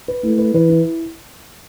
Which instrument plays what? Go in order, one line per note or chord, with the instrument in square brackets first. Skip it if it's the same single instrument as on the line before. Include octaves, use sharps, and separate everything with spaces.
[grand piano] B4
[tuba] A3 [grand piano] E4
[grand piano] B4
[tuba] E3 [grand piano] B4
[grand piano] E4